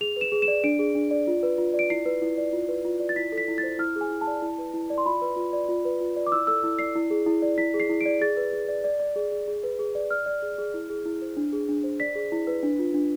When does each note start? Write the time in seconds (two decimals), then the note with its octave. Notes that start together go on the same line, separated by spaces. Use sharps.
0.01 G#4 F7
0.16 B4 E7
0.32 G#4
0.42 E7
0.48 D5
0.64 D4 D7
0.79 G#4
0.95 D4
1.11 D5
1.27 F4
1.43 B4
1.58 F4
1.74 D5
1.79 D7
1.90 E4 C7
2.06 B4
2.22 E4
2.38 D5
2.53 F4
2.68 B4
2.85 F4
3.00 D5
3.09 A6
3.16 E4 B6
3.32 A4
3.38 B6
3.48 E4
3.58 A6
3.63 C5
3.79 E4 F6
3.96 G#4
4.01 G#5
4.11 E4
4.21 A5
4.27 D5
4.42 E4
4.58 B4
4.74 E4
4.90 D5
4.98 C6
5.06 F4 B5
5.22 B4
5.37 F4
5.53 D5
5.69 F4
5.85 B4
6.01 F4
6.16 D5
6.27 D6
6.32 E4 E6
6.47 A4 E6
6.64 E4
6.79 D5 C7
6.95 E4
7.11 G#4
7.26 E4
7.42 D5
7.58 E4 B6
7.74 G#4
7.80 C7
7.89 E4
8.01 D7
8.06 D5
8.21 G#4 A6
8.37 B4
8.53 G#4
8.68 D5
8.84 D5
9.00 D5
9.16 G#4
9.32 G#4
9.48 G#4
9.63 B4
9.79 G#4
9.95 D5
10.10 D5 F6
10.26 D5
10.42 G#4
10.58 G#4
10.74 E4
10.90 G#4
11.06 E4
11.22 C5
11.37 D4
11.53 G#4
11.69 D4
11.84 C5
12.00 D5 B6
12.15 G#4
12.32 E4
12.47 B4
12.63 D4
12.79 F4
12.94 D4